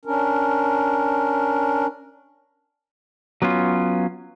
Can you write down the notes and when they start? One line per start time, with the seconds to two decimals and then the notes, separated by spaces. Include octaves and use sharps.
0.05 C#4 D4 A#4
3.42 F#3 B3 C#4 F4